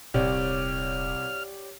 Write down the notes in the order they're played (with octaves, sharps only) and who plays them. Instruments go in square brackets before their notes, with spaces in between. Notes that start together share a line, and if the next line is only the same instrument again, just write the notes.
[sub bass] D#1 [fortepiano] C2 [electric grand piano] G4 C#5 D5 [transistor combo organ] F6